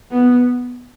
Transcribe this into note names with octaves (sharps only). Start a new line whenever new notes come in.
B3